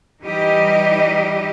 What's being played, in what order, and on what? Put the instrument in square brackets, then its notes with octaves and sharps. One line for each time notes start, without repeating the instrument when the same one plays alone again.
[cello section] E3 G3 D#4 G4 D#5